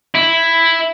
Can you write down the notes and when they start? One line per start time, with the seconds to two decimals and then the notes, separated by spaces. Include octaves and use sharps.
0.15 E4